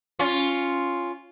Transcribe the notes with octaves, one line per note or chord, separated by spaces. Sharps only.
C#4 F4